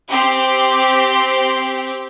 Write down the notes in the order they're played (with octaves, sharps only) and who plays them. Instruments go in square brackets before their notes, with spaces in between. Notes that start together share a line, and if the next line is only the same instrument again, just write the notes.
[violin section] C4 G4